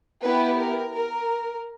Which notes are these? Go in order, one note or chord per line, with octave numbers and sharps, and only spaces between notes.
B3 E4 G4 B4
A#4
A#4